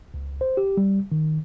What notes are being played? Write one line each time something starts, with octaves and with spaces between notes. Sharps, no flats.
C#2
C5
G4
G3
D#3